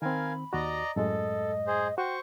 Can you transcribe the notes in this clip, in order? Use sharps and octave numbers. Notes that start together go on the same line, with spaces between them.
D#3 C4 A#4 F5 G#5 B5
D#2 F#4 D5 D#5 A#5
F#2 A2 G#3 A4 D#5
G#4 C5
F#4 C5 G5 C#6